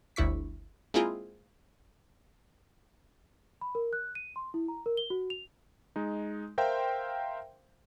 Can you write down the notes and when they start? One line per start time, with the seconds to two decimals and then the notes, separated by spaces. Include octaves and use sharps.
0.16 G1 D2 E4 C#6 B6
0.94 G#3 A#3 C4 E4 F4 G#4
3.61 B5
3.75 A#4
3.93 F#6
4.15 D#7
4.36 C6
4.54 E4
4.68 A#5
4.86 A#4
4.97 G7
5.10 F#4
5.30 F7
5.96 G#3 D#4
6.58 A#4 C5 E5 F5 G5 C6